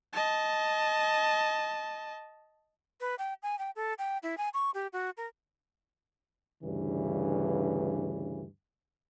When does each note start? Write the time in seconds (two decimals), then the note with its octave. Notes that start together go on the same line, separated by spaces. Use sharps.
0.13 D#5 A5
3.01 B4
3.19 G5
3.43 G#5
3.59 G5
3.76 A4
3.98 G5
4.23 E4
4.38 G#5
4.54 C#6
4.74 G4
4.93 F#4
5.17 A#4
6.63 D2 G2 C#3 E3